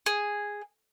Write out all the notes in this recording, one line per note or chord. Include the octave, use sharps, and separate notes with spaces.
G#4